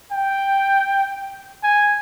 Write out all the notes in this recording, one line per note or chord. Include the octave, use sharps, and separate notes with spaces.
G5
G#5